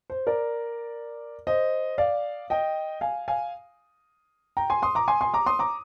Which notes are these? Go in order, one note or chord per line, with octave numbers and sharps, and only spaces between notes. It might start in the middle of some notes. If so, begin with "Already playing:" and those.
C5
A#4 D5
C5 D#5
D5 F5
D#5 G5
F5 G#5
F5 G#5
G5 A#5
G#5 C6
C6 D#6
A#5 D6
G#5 C6
G#5 C6
A#5 D6
C6 D#6
A#5 D6